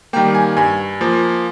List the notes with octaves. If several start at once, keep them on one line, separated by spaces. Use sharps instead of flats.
D#3 G3 A#3 G5
G#5
G2 G#5
F3 A#3